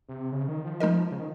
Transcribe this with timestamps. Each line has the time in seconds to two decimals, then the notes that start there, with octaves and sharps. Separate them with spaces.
0.09 C3
0.32 C#3
0.48 D#3
0.64 F3
0.80 G#3 D#4 A#4 D#5
1.11 C#3
1.19 D#3